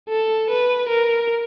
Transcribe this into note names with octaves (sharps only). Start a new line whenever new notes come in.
A4
B4
A#4